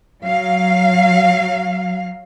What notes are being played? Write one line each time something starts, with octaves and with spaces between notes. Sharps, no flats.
F#3 F5